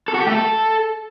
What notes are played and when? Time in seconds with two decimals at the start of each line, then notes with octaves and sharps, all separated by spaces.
0.08 A4
0.14 F#4
0.21 G4
0.27 A3
0.33 A4